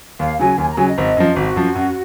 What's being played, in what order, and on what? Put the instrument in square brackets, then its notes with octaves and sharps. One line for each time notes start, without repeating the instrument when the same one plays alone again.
[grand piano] D#2 [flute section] F5
[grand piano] C#3 F#3 [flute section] G#5
[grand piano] D#2 [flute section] G#5
[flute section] A#5
[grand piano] C#3 F#3 [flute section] G#5
[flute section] D#5
[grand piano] G#1
F#2 F3
[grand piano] G#1 [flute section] F#4
[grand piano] F#2 F3
F#2